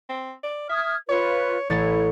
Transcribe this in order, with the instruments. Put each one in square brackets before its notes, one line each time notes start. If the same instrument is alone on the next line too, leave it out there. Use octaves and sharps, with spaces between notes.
[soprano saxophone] C4
D5
[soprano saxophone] E5 [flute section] D#6 F6 G#6
[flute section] F4 B4 [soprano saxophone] C#5
[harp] A1 A6 [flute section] E4 [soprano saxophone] C#5